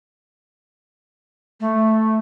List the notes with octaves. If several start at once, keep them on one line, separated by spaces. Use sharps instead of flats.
A3